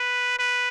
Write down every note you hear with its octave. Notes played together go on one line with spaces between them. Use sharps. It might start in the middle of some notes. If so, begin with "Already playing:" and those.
Already playing: B4
B4